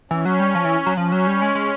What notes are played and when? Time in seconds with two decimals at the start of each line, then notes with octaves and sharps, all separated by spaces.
0.11 E3 C#4
0.25 F#3
0.40 G3
0.55 F3
0.65 E3
0.86 F#3
0.97 F3 C#4
1.12 F#3
1.27 G3
1.42 G#3
1.55 G#3